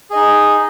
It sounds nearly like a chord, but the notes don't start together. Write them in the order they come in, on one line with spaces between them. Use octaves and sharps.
G#4 D#5 D#4